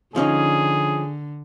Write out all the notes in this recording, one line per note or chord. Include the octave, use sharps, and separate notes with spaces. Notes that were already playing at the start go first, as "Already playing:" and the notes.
D3 F3 C#4 D#4 G#4